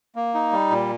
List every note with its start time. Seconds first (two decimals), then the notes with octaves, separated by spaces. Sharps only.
0.16 A#3
0.34 D#4
0.52 G3
0.71 A#2